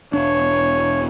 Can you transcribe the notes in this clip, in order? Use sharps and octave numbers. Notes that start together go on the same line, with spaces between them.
E1 D4 C#5